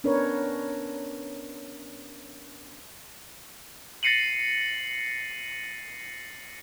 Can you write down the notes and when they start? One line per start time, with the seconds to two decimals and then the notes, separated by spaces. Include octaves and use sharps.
0.04 B3 C#4 D4 A#4 B4 C#5
4.03 A6 A#6 C7 C#7 D#7 F#7